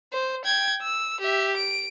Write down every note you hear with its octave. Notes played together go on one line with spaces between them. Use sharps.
C5
G5 G#6
E6
G4 E5
D7